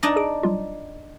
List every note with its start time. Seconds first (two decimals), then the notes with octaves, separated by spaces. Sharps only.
0.03 D4 D#4 D#5 A6
0.16 G#4 D7
0.43 F#3 G3 F4